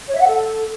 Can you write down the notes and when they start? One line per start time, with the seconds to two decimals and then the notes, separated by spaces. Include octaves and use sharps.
0.08 C#5
0.15 E5
0.21 F#5
0.28 A4